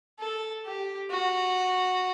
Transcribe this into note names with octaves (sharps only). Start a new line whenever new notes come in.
A4
G4
F#4